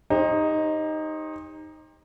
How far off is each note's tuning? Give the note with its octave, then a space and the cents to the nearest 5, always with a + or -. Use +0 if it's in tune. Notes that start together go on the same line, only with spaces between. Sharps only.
D#4 +0 G4 +35 C5 +35